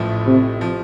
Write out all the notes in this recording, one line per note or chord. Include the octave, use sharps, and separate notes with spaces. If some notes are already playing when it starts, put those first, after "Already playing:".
Already playing: A1 A2 F3 A3
C3
F3